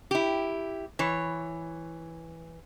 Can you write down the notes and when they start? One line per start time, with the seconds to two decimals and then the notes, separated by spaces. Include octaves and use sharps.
0.11 E4 G4
0.99 E3 C#5